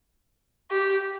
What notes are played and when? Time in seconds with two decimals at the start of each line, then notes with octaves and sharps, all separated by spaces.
0.71 G4